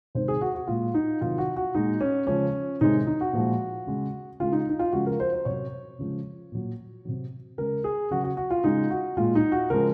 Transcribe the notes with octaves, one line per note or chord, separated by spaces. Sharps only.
C3 D#3 G#3 C5
G#4
F#4
F#4
A#2 G#3 F4
D#4
C3 D#3 F#3 F4
F#4
F#4
A#2 G#3 D#4
C#4
C#3 F3 G#3 C#4
C3 D#3 G#3 D#4
D#4
F#4
A#2 F3 G#3
C#3 G#3
C#3 G#3 F4
D#4
D#4
F4
C#3 F3 G#3 F#4
A#4
C5
C5
C3 F#3 C#5
C#3 F3 G#3
A#2 F#3
C3 F#3
C#3 G#3 A#4
G#4
C#3 F#3 F#4
F#4
F#4
F4
C#3 G#3 D#4
F#4
A#2 G#3 F4
D#4
F#4
C#3 F3 G#3 A#4